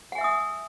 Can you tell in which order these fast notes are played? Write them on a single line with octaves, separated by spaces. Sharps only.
F#5 G#5 E5 E6 D#6